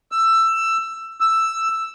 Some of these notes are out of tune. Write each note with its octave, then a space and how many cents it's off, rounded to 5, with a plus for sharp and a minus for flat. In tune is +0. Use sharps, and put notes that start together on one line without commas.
E6 +15
E6 +5